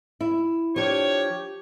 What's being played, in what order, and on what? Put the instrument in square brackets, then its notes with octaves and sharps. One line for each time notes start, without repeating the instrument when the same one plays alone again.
[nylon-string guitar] E4
[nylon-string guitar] F3 D4 [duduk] G4 [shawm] C#5